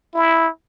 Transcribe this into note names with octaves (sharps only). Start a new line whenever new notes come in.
E4